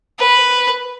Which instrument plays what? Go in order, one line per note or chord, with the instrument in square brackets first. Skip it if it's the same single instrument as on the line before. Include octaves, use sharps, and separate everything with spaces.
[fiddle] B4